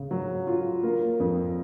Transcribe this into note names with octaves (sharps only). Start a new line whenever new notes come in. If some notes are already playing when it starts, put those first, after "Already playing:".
Already playing: C#3
F#3
F4
A#3
F2